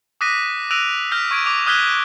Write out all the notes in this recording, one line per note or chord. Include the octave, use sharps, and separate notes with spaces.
D6 D#6 F#6 A#6 B6 D#7
E6 F#6 A#6 D7 D#7 F7
F6 G6 A#6 B6
C#6 G#6 D7
D6 F7
D#6 F6 F#6 G#6 B6 G7